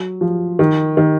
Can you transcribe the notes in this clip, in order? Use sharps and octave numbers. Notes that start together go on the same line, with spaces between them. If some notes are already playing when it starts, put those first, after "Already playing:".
Already playing: F#3
F3
D#3
D#3